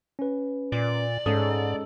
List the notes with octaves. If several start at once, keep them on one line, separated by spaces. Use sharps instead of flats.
C#4 B4
A#2 D5
G#2 G#3 C#4 A4 D#6